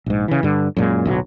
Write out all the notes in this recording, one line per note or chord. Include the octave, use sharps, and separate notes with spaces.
A#1 G#2
C#3 E3
G2 D3
F#2 A#2 G#3
D1 B1 F#3